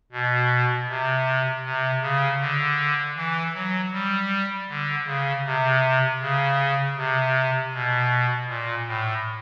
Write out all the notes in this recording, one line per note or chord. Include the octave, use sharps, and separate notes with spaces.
B2
C3
C3
C#3
D3
E3
F#3
G3
D3
C#3
C3
C#3
C3
B2
A#2
A2